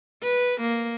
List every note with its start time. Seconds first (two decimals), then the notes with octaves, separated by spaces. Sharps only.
0.23 B4
0.61 A#3